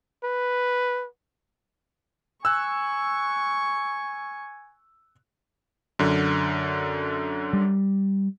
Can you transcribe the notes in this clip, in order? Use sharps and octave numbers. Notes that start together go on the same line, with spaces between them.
B4
G#5 C#6 E6 F#6
F#2 D3
G3